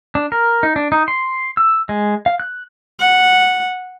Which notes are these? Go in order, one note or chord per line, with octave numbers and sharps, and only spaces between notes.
D4
A#4
D#4
D4
D#4
C6
E6
G#3
F5
F#6
F#5